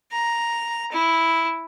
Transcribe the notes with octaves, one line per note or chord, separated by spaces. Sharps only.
A#5
E4